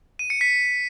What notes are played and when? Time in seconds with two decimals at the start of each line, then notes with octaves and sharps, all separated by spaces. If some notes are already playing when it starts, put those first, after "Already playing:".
0.19 D#7
0.30 C#7
0.41 B6